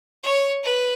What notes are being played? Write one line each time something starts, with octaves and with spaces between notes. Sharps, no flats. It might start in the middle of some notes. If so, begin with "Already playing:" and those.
C#5
B4